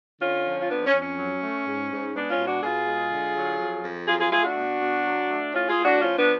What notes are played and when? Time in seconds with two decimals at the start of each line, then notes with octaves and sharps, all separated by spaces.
0.21 D3 C#4 F4
0.46 F3
0.61 F4
0.70 F2 B3 D4
0.86 C#4
0.94 F2
1.02 C#4
1.18 F#3
1.43 A3
1.66 G#2
1.91 G#2
2.15 G#3 B3 D4
2.31 C#4 F4
2.39 B2
2.47 D4 F#4
2.63 B2 F4 G#4
2.88 G#3
3.12 D3
3.36 F#3
3.60 F2
3.84 F2
4.08 F#3 F4 G#4
4.20 F4 G#4
4.32 A3 F4 G#4
4.44 D4 F#4
4.57 B2
4.81 B2
5.05 F#3
5.29 A3
5.53 A2 C#4 F4
5.69 F4 G#4
5.78 A2
5.85 D4 F#4
6.01 F3 C#4 F4
6.18 B3 D4